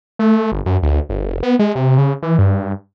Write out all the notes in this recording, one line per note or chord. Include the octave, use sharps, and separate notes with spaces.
A3
G1
F#2
D2
G1
F1
B3
G#3
C3
C#3
E3
G2